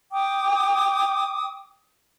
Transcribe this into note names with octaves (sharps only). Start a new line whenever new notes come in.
G5 D6 D#6